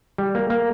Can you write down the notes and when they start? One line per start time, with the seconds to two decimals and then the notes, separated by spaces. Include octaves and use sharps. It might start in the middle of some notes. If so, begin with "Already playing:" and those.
0.18 G3
0.35 A#3
0.50 A#3